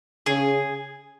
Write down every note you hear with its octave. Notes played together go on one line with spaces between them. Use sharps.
C#3 G#4